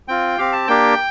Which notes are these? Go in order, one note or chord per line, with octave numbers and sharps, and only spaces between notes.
C4 F4 G5
C4 G4 F5
A5
A#3 D4 G4 G5